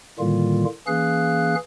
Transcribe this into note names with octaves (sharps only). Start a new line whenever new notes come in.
A2 D3 D#3 G3 A#3 F4
E3 A#3 C#4 G#4 F5 F#6